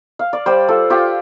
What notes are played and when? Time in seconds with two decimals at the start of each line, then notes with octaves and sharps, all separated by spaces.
0.19 F5
0.33 D5
0.46 G3 C5
0.68 F4 A4
0.90 F4 G4